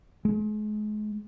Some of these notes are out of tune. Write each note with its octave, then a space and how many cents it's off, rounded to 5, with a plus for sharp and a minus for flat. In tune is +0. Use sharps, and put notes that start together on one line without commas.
G#3 +35